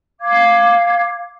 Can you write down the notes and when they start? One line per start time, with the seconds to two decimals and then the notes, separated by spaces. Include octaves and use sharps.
0.20 F5 D6 G#6